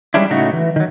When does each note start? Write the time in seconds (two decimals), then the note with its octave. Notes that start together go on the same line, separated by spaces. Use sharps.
0.14 G3 G#3 C#4 D4 E4
0.30 A2 C#3 A3 D#4 F#4
0.53 E3
0.76 D#3 F#3